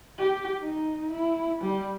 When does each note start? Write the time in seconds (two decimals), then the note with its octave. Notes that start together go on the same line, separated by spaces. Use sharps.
0.18 G4
0.63 D#4
1.11 E4
1.61 G3